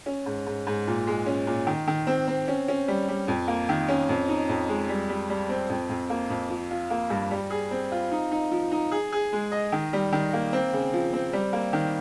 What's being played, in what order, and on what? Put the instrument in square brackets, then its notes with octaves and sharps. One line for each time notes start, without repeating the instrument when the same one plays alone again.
[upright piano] C#4
G#2
G#2
G#2
A#2
G#3
C#4
A#2
D#3
D#3
C4
C4
C#4
C#4
G3
G3
F2
A#3
D#3
C#4
F2
D#4
F2
G#3
G3
G3
G3
C4
F2
F2
A#3
F2
F3
F4
A#3
G2
G3
G#4
C4
F4
D#4
D#4
F3
D#4
G#4
G#4
G#3
D#5
D#3
G3
D#3
A#3
C4
C#3
F3
C4
G3
A#3
D#3